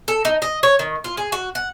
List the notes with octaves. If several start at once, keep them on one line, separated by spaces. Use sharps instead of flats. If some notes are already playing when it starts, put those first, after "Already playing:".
A4
D#4
D#5
C#5
D#3
F4
G#4
F#4
F#5